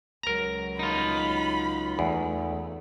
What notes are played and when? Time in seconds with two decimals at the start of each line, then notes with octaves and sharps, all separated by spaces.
0.23 C#2 F#3 A#4 A#5
0.79 D#4 F4 B5
1.99 E2 A3 B3